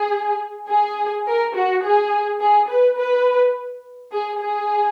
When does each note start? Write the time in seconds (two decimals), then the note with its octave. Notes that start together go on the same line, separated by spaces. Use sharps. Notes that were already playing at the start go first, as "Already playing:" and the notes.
Already playing: G#4
0.70 G#4
1.27 A#4
1.56 F#4
1.84 G#4
2.41 G#4
2.70 B4
2.98 B4
4.12 G#4
4.40 G#4